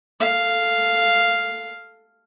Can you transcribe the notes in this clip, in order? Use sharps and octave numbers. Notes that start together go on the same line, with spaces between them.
A4 F5